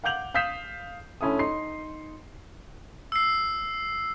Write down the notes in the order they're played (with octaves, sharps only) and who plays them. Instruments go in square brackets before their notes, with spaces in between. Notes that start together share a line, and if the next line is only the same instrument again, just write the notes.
[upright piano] F5 F#5 D6 G6 F7 F#7
F5 D#6 G6 B6 C7 E7
D2 C#4 E4 A4 D#6
D#4 C6 C7
[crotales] E6 C7